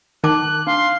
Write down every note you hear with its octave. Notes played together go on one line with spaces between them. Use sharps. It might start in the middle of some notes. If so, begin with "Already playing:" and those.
D#3 D#4 A5 D6 F#6
D4 F5 C6